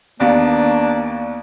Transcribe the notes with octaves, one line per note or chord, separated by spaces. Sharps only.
D#2 A#3 B3 D4